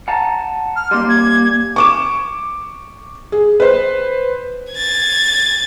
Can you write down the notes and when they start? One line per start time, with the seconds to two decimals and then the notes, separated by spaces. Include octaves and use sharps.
0.08 F#5 A5 A#5
0.76 F6
0.91 G3 A#3 C6
1.09 G#6
1.76 C#6 D6 E7
3.32 G#4
3.60 B4 C5
4.73 G#6 A6